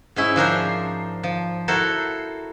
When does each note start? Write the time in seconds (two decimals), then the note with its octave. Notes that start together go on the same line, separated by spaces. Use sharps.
0.16 G#2 C#4 E4
0.36 F3 D4 A#4 C5
1.23 F3
1.68 E4 F#4 A4 A#4 C5